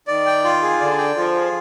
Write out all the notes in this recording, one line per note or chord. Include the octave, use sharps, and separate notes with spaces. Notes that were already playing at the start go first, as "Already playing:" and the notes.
D#3 D5
G5
F4
G#4
D3 D5
G5
F3 F4
G#4